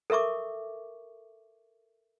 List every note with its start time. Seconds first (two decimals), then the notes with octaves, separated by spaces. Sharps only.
0.10 A4 A#4 E5 C#6 D6